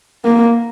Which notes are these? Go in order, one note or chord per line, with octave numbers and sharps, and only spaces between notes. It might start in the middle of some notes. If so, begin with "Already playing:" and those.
A#3